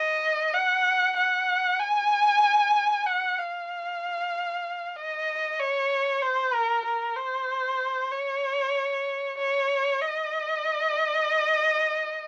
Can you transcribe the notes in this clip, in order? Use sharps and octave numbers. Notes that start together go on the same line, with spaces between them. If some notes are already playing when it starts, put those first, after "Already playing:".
Already playing: D#5
F#5
F#5
G#5
F#5
F5
D#5
C#5
C5
A#4
A#4
C5
C#5
C#5
D#5